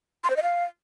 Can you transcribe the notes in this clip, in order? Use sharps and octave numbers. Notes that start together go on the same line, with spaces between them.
C6
C5
D#5
F5